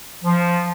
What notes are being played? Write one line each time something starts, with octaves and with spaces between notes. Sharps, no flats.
F3